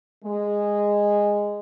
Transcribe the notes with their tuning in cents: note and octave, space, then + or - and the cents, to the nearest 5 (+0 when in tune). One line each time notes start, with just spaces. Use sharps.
G#3 -10